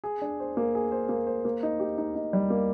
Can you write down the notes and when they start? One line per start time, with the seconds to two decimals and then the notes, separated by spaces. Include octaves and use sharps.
0.04 G#4
0.22 D4
0.40 C5
0.57 A#3
0.75 G#4
0.92 C5
1.09 A#3
1.27 C5
1.45 A#3
1.63 D#4
1.80 G4
1.98 D#4
2.15 D#4
2.33 G3
2.50 A#3